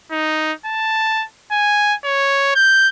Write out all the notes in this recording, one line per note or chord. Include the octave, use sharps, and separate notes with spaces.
D#4
A5
G#5
C#5
G6